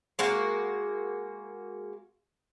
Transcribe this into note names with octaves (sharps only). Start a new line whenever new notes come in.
G#3 A#3 F#4